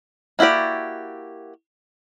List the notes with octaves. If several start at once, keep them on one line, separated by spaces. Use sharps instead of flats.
A#3 E4 F#4 G4 D5